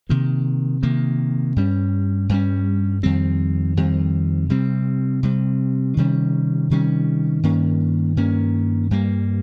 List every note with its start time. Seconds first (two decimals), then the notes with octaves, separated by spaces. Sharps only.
0.09 C3 D#3 A#3
0.83 C3 D#3 A#3
1.56 G2 G3 C#4
2.29 G2 G3 C#4
3.03 F2 D#3 G3 C4
3.77 F2 D#3 G3 C4
4.50 C3 G3 C4
5.23 C3 G3 C4
5.97 C3 D#3 G3 C#4
6.70 C3 D#3 G3 C#4
7.43 G2 D#3 A#3 C#4
8.17 G2 D#3 A#3 C#4
8.91 G2 G3 A#3